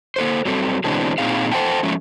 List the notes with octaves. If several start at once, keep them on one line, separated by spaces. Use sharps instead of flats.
A#3 A4 C5
F#3 G3 C4 A4
B2 D3 E3 G#3 C4 D4
A#2 F#3 C4 D#4 G#4 F5
A4 C5 E5 F#5 G5 A5
F3 G#3 A3 C#4